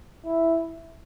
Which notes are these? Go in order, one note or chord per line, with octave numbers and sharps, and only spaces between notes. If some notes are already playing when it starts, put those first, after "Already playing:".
E4